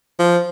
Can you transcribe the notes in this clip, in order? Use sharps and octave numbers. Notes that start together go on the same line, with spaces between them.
F3